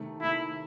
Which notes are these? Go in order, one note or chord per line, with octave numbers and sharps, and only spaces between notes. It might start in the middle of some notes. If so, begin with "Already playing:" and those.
Already playing: C3 D#3 A3
C3 D#3 A3 E4